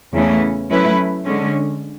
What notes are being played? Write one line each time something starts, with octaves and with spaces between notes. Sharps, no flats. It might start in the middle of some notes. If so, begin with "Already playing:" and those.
E2 C#3 E3 A3 C#4
F#3 A3 C#4 E4 B4
D3 G#3 C#4